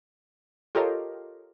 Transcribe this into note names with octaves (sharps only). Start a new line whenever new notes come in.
F4 G4 A4 A#4 C#5 D#5